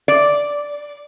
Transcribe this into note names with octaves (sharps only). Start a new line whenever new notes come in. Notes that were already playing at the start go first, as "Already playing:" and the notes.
D5